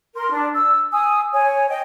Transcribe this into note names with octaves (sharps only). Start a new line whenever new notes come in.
A#4 C6
D4
E6
G#5 D#6 E6
C#5 G#5
D#5 G5